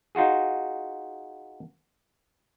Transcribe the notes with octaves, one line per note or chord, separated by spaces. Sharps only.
D#4 F4 F#4 G#4